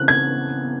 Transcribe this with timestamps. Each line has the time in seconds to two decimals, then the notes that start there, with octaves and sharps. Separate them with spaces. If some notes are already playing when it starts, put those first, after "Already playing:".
Already playing: C#3 E3 C4 E4 F#6
0.08 G#6